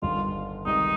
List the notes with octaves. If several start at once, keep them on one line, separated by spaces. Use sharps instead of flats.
G1 G2 D#3 G3 F4
C#2 C3 D#3 G3 C4 D#4